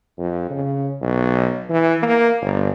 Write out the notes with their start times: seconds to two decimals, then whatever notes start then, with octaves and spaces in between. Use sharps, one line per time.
0.18 F2
0.50 C#3
1.02 B1
1.70 E3
2.03 A#3
2.42 G1